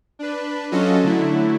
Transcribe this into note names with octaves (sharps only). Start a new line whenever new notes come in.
D4 B4
F#3 C#4 F4 F#4 A4 D#5
D3 F#3 A3 E4